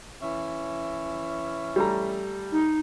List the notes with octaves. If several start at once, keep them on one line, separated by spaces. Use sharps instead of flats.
E3 C#4 E5
G3 A3 A#5
D#4